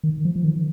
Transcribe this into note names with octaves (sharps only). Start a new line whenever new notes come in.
D#3
F3
F3
D#3